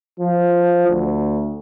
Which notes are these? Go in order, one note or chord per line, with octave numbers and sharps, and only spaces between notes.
F3
D2